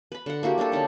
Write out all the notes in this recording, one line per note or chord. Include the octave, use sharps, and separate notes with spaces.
B4 B5
D3 F#5
A#3 E4 F#4 G4
G3 A#3 D4 A4
D3 C#4 D#4 D5